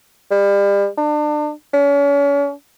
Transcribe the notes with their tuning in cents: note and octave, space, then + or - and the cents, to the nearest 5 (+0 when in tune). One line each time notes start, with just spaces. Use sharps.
G3 +35
D4 +35
C#4 +40